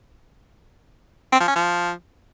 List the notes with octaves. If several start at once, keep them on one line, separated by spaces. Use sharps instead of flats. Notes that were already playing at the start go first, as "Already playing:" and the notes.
C4
F3
C#4
F3